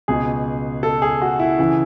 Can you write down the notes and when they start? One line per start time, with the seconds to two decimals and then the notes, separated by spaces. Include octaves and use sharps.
0.08 C#2 B2 G#4
0.83 A4
1.02 G#4
1.22 F#4
1.39 E4
1.59 C#3 E3